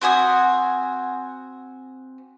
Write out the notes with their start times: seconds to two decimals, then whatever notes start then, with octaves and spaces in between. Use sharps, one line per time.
0.01 C4 F#4 G#5 D#6